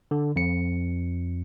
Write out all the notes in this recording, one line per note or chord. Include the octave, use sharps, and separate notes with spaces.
D3
F2 C#7